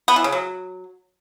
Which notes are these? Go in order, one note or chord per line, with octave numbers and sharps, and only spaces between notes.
B3
E3
C#3
F#3